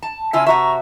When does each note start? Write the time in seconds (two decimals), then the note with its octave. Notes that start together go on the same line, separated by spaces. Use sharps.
0.02 A5
0.33 C#3 E4 F4 E5 G#5 E6
0.46 C3 F#4 E5 A#5 C#6